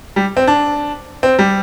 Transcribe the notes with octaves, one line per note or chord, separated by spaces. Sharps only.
G3
C4
D4
C4
G3